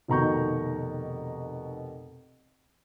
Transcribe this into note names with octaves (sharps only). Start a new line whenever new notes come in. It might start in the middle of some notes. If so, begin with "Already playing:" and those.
F1 B2 D#3 A#5 C#6 G6